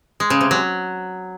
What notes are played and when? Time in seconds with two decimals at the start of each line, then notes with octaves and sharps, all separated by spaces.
0.20 G#3
0.30 C#3
0.41 C3
0.51 F#3